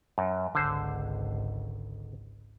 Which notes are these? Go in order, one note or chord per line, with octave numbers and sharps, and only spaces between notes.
F#2
G#1 C#2 D3 C5